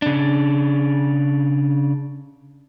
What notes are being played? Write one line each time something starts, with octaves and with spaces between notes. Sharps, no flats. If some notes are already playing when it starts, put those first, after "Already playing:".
C#3 D4